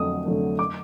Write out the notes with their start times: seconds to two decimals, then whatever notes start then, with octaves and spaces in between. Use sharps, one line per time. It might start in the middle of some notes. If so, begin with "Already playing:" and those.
Already playing: F2 D3 F#3 A3 D#6
0.25 D3 F#3 A3
0.59 D6